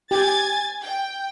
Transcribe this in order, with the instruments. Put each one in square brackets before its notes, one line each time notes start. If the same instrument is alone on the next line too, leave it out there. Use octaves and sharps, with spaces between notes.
[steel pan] G4 [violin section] G#5 G#6 A6
[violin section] G5